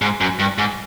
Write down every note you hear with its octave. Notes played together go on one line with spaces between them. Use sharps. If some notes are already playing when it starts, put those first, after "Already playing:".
G#2
F#2
G2
G#2